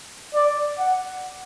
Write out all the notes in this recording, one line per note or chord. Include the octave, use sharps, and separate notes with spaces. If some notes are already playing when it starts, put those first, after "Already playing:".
D5
F#5